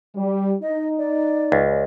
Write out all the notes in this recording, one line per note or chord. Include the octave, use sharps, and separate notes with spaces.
G3
D#4 D#5
D5
C#2